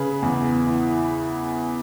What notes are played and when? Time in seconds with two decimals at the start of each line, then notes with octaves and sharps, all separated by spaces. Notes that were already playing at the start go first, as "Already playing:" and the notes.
Already playing: C#3 G#4 B4
0.22 E2
0.67 E3